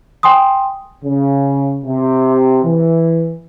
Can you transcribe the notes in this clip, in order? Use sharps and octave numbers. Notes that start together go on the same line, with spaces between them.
G5 G#5 C6 D#6
C#3
C3
E3